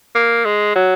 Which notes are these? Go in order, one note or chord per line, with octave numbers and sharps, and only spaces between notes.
A#3
G#3
F#3